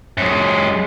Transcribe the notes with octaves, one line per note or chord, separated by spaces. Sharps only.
F#2 G#3